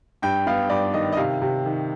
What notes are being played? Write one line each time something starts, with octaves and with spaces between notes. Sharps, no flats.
G2 G5
B3 F5
G2 D5
D#3 D#5
D#5
C3 F5
C3
D#3